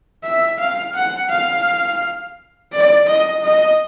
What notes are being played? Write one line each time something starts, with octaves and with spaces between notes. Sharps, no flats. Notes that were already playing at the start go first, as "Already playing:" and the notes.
E5
F5
F#5
F5
D5
D#5
D#5